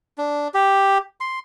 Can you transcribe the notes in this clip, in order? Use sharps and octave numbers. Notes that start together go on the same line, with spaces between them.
D4
G4
C6